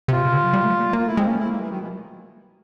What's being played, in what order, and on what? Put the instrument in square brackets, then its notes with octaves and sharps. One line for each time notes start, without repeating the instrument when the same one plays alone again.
[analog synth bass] C3 [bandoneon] F4
[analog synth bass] C#3
D3
F#3
G3
A3
A#3
[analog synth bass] A#3 [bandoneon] F4
[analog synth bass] A3 [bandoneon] E4
[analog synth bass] G#3 [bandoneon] C4
[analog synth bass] A#3 [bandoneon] C#4
[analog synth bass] A3 [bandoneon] E4
[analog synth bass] G#3 [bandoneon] A#3
[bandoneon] E3 [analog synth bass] G3
[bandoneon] D#3 [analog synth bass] F#3
[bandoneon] B2 [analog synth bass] F3